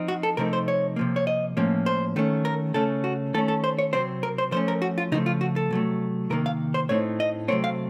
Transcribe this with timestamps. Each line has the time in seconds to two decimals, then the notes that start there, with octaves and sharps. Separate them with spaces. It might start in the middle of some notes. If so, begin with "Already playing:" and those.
Already playing: F3 C4 D#4
0.08 F#4
0.23 A4
0.37 C3 F3 A3 C4 D#4 A#4
0.53 C5
0.68 C#5
0.96 C3 F3 A#3
1.16 C#5
1.27 D#5
1.57 A2 F3 A#3 C#4
1.86 C5
2.16 D#3 A3 C#4
2.45 A#4
2.74 C#3 A3 C#4 A4
3.04 F#4
3.34 D#3 A3 C#4 A4
3.48 A4
3.64 C5
3.79 C#5
3.93 C3 F#3 C4 C5
4.23 A#4
4.38 C5
4.52 F3 A3 C#4 C5
4.68 A#4
4.82 F#4
4.98 F4
5.12 C#3 F3 A3 D#4
5.26 F4
5.41 F#4
5.56 A4
5.71 C3 F#3 A3
6.30 C3 D#3 A#3 A#4
6.46 F5
6.74 C5
6.89 A2 A3 C4 D#4 C#5
7.20 D#5
7.48 C3 F#3 A3 C4 C#5
7.64 F5